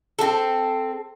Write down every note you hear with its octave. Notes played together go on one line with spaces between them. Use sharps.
C4 A4